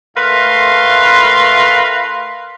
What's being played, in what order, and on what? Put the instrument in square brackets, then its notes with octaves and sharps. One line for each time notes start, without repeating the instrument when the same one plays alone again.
[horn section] A2 A3 A#4 B4 F5 C6